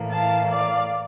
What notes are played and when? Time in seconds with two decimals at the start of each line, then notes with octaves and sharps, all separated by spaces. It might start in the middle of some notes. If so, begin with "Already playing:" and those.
Already playing: A2 E3 A#3
0.12 F5 A5
0.51 D5 F5